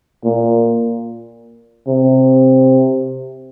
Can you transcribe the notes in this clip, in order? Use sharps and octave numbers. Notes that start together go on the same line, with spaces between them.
A#2
C3